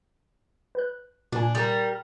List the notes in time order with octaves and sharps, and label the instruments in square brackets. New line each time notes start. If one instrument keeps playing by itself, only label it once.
[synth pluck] B4 F#6
[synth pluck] A#2 G#5 [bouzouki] D4
[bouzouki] G3 A#4